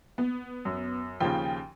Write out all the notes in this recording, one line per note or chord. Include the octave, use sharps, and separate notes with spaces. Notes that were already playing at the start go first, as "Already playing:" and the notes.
B3
F#2
D#2 C#3 F3 G5